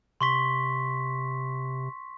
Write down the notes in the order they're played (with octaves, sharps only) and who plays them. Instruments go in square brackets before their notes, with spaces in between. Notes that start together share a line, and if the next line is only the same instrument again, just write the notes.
[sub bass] C3 [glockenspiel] C6 C#6 B6